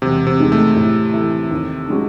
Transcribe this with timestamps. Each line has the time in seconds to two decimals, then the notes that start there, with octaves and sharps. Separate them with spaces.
0.02 E1 C3
0.27 C3
0.39 D#2 D#3 G#3
0.52 A3
0.76 A2
1.13 E3 A3
1.50 D#2
1.88 D#3 G#3 C#4 F#4